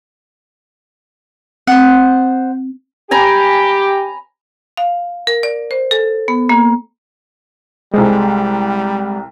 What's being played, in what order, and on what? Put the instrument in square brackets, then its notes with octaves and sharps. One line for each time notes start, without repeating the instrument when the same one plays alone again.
[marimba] C4 [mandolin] C5 F#5
[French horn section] G4 [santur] G#5 A#5 B5
[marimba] F5
A#4
D5
C5
A4
B3
A#3
[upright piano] C2 A4 C5 [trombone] G3 [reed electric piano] G#3